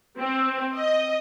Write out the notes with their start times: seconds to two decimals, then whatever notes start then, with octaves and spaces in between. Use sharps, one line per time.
0.18 C4
0.75 D#5